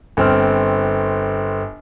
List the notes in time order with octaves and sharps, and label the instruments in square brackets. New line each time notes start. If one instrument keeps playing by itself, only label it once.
[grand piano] G1 C4 F6